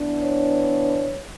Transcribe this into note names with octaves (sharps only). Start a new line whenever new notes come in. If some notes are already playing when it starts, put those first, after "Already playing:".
Already playing: E3 B3 D4
C#5